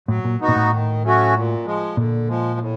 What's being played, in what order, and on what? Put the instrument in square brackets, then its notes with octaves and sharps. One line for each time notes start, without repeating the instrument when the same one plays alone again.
[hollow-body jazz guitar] A2 [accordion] F#3
[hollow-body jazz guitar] A#2
[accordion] B3 D#4 F#4
[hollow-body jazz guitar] A#2
A2
[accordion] D#3
F#3 A3 C#4 F#4
A#2
F3 G#3
[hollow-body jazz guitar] A#2 [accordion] D3
[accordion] F3 G#3
A2